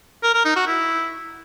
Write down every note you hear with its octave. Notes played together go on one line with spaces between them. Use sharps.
A#4
A#4
D#4
F#4
E4